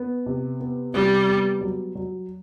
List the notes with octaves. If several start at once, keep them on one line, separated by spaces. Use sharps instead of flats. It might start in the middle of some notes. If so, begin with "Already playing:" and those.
Already playing: B3
C3
B3
C3 G3
B3
F#3
F#3